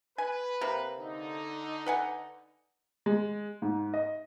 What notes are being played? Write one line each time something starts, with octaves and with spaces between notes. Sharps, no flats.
B4 G#5
C3 A#3
D3 D#4
B4 F#5 G#5
G#3
G#2
D#5